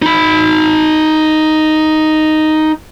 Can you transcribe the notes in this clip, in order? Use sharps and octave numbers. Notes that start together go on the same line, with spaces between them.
D#4 B5